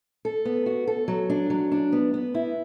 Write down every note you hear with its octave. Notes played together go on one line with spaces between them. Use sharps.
A4
B3
F#4
A4
F#3
D4
F#3
D4
B3
B3
E4